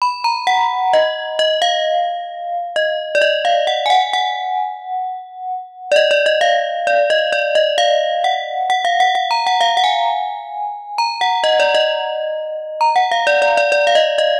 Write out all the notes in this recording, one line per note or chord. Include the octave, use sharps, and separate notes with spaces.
B5
A#5
F#5
D#5
D#5
F5
D#5
D5
D#5
F5
F#5
G#5
F#5
F#5
D5
D#5
D5
D#5
F5
D5
D#5
D5
D#5
F5
F#5
F#5
F5
F#5
F#5
A#5
F#5
F5
F#5
G#5
A#5
F#5
D#5
D5
D#5
A#5
F#5
F5
D5
D5
D5
D5
F5
D#5
D#5